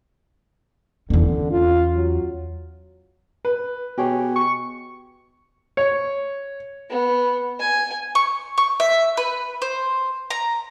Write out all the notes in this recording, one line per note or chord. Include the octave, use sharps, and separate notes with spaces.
E2 D3 C#4
F4
F#3
B4
B2 G4 G#4 C#5
C#6
C#5
B3
G#5
C#6
C#6
E5
B4
C5
A#5